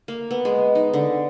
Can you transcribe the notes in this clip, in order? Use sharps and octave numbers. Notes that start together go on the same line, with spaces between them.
A#3
B3
G#3
D#4
D3